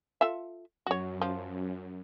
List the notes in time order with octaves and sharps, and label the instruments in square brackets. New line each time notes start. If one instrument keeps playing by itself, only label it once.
[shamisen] F4 A4 E5
[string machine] F#2 [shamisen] F#4 C#5
[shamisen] F3